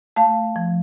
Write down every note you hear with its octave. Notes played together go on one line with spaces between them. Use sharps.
A3 F5 A5
F3